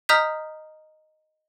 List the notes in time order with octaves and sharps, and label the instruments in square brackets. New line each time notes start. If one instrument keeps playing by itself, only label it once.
[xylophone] D#5 A#5 D#6 F6 G6 B6